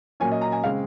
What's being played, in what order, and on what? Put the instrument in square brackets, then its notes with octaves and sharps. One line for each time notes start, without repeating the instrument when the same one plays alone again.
[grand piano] A#2 F#3 A#3 C#4 G#5
D#5
A#5
G#5
C#3 G#3 C4 F5